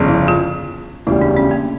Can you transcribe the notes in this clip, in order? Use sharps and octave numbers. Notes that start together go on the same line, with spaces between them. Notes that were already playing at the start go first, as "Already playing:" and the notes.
Already playing: G1 F2 C#3
E4
F4
E1 D2 C#3 G3 E4
D4
C#4
A#3